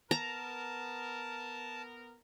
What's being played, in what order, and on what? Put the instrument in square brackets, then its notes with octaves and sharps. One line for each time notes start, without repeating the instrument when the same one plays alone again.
[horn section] B3 A#4 [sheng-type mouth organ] A5 [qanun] A#5